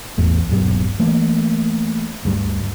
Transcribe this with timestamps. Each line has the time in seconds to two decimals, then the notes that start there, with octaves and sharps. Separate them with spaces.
0.18 A1 E2 A3
0.49 D#1 B1 G2 G3
0.99 E3 A3 A#3
2.25 D2 G2